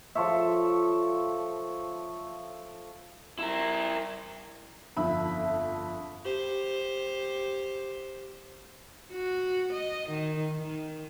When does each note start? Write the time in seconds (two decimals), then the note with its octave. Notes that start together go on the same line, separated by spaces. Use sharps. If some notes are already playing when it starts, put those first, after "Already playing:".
0.15 F3 A4 C#5 E5
3.39 E4 A#4
4.97 G1 F2 E5 B5
6.24 G4 C5
9.12 F#4
9.72 D#5
10.09 D#3
10.57 D#3